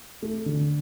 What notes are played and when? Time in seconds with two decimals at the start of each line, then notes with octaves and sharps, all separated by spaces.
0.22 A3
0.46 D3